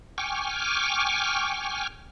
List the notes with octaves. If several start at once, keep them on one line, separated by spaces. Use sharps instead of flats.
G5 G#5 C#6 D6 F6